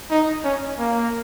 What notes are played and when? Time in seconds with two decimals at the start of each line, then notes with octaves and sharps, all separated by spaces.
0.10 D#4
0.44 C#4
0.78 A#3